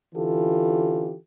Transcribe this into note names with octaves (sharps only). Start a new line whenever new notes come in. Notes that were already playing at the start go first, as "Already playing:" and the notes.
D3 E3 C#4 F4 G4 A4